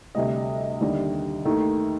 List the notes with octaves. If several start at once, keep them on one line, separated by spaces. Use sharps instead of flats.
D2 C3 G3 D#5
D#2 D3 G3
D#2 D#3 A3